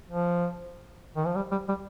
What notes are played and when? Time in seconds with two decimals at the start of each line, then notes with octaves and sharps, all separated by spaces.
0.10 F3
1.16 D#3
1.26 F3
1.36 G3
1.52 G3
1.68 G3